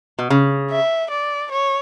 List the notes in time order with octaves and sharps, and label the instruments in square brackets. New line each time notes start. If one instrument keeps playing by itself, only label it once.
[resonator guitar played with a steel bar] B2
C#3
[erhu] E5
D5
C#5